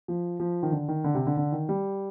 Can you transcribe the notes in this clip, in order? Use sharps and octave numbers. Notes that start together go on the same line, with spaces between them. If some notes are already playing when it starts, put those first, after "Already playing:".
F3
F3
D#3
D3
D#3
D3
C3
D3
D3
D#3
G3